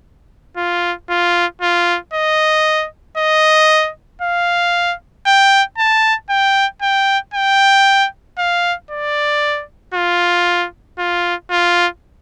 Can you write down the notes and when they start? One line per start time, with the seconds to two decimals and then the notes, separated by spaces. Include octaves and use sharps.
0.57 F4
1.09 F4
1.62 F4
2.14 D#5
3.18 D#5
4.22 F5
5.26 G5
5.78 A5
6.30 G5
6.82 G5
7.34 G5
8.38 F5
8.91 D5
9.94 F4
10.99 F4
11.51 F4